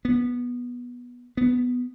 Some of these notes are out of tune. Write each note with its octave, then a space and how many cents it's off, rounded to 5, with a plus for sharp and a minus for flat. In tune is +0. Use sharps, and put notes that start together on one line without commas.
B3 -15
B3 +5